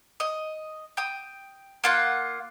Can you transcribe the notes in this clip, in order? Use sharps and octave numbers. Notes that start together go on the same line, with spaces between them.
D#5
G5 D#6
A#3 F4 F#5